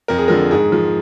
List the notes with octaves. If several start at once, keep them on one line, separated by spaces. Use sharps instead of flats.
F2 A#4
G#4
D3 F3 A#4
G#2 G#4
F3